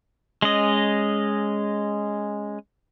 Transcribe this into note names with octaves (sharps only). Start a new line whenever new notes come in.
G#3 C#4 D#5